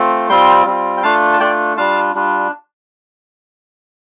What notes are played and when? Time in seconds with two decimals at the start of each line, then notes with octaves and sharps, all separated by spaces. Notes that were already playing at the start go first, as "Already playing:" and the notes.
Already playing: A3 C4 F4
0.29 G3 C4 F4 G5 C6
0.66 G3 C4 F4
0.97 G5
1.03 A3 D4 F4 F5 A5
1.33 A5
1.40 A3 D4 F4 D5 G5
1.77 G3 D4 F4 F5 A5
2.15 G3 D4 F4